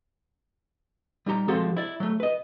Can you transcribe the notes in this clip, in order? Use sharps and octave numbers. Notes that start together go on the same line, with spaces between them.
G3 D#4 G4 A#5
F3 G#3 C4 F#4 G4 A4
E4 D5
F#3 A3
B4 D#5